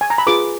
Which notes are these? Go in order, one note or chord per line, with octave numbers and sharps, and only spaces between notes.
G#5
A#5
B5
F4 G#4 B4 D6